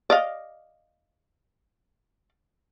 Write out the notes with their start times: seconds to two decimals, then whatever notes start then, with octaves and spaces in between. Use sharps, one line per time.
0.10 D5 D#5 F5